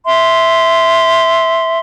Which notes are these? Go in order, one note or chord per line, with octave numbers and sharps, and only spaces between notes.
E5 C6